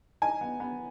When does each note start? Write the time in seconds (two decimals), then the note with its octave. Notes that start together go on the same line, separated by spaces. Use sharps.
0.22 D#4 G#5
0.41 B3
0.60 B3